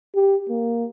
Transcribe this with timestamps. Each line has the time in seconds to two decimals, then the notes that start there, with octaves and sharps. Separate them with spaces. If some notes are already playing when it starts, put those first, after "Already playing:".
0.15 G4
0.50 A#3